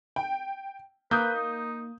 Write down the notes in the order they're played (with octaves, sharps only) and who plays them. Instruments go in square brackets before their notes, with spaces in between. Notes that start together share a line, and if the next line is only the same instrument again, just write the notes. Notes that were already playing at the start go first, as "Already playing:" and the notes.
[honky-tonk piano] G5
[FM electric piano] A#3 [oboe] B4 [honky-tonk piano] D#6 G6
[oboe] D#4